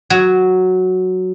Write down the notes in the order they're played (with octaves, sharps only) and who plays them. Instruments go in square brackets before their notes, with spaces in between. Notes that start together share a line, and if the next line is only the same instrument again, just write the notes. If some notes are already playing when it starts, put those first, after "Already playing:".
[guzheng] F#3